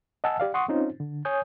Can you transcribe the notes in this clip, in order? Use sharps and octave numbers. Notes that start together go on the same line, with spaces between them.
D#5 F#5 G#5 A5 E6
G4 D5 F5
F#5 C6 C#6 D#6
C4 C#4 D#4 F4 C5
D3
C#5 G#5 D#6 G6